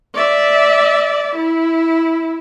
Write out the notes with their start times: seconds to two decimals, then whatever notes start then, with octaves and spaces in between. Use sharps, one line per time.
0.14 D5 E5
1.36 E4